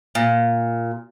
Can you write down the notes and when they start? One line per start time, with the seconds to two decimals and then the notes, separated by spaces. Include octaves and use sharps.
0.15 A#2